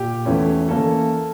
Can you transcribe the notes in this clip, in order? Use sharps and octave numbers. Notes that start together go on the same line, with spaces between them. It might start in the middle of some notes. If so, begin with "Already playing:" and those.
Already playing: A#2 G4
E2 E3 A3 C#4
E3 A#3 C#4 A4